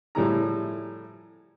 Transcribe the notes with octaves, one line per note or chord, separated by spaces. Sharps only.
A2 F3 G3 E4 G#4 A#5